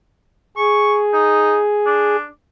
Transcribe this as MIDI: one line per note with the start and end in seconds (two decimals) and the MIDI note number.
0.57 2.16 68
0.57 0.97 85
1.13 1.59 63
1.86 2.25 62